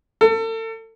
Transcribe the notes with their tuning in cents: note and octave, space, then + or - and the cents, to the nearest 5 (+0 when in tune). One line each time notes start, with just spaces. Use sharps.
A4 +35